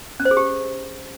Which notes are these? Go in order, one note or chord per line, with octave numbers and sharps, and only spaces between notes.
C#4
C5
G#4
G4